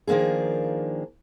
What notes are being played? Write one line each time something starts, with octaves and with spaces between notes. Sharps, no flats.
D#3 F3 A#3 D4 G#4